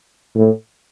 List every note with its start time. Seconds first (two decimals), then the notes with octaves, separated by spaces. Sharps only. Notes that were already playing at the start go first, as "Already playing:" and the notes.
0.36 A2